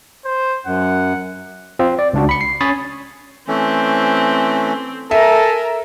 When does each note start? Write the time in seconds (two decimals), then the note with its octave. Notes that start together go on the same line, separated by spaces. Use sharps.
0.25 C5
0.66 F#2 F#5
1.79 C4 F4
1.99 D5
2.13 C#2 D4 F#4
2.29 B5 C#7
2.41 C7
2.61 C#4 C#5 B5 D#6 A6
3.48 E3 A3 C4 C#4
5.11 A4 A#4 E5 G#5 A#5